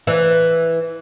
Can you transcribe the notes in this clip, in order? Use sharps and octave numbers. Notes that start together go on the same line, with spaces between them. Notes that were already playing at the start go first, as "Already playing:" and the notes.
E3